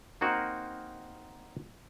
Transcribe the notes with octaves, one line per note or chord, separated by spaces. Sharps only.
A#3 C4 D#4 F#4 A#4